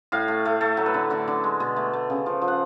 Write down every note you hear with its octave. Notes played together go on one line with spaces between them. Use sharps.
A2 F5
A3
A3
A3 A4
F#3
B4
D3
D3 D5
D3
G#3
B2
A3
A3
C#3
F3
F3
F#5